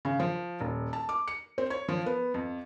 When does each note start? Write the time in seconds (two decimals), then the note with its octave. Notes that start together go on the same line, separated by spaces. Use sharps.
0.05 C#3
0.20 F3
0.61 D#1
0.93 A5
1.09 D6
1.28 C#7
1.58 C4
1.70 C#5
1.89 F3
2.06 B3
2.34 F2